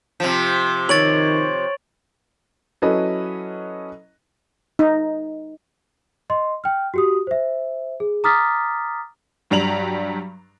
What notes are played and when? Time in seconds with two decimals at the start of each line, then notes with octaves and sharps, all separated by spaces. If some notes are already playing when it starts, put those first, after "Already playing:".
0.20 C3 F3
0.89 D#3 C#5 A6 D7 F#7
2.82 F#3 C#4 E4 A4 B4 D#5
4.79 D#4
6.30 D#5 C6
6.64 G5 F6
6.94 F#4 G4 D#6
7.27 C5 E5
8.00 G#4
8.24 A#5 D6 D#6 F6 A6 B6
9.50 G2 F#3 G3 A#5 F7 F#7